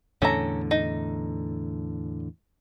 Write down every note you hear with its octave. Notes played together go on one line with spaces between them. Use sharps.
E2 A2 D3 C#4 A4 A#5
D#4